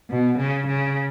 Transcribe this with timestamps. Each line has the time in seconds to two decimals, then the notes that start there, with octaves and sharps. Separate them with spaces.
0.10 B2
0.38 C#3
0.67 C#3